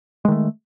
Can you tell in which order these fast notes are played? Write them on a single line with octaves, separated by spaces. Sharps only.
G#3 D#3 A3